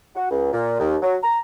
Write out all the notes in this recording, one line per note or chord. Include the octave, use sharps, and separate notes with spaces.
F#4
C#2
A#2
D#2
F#3
A#5